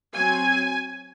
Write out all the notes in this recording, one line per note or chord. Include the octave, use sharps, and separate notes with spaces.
F#3 C4 G#5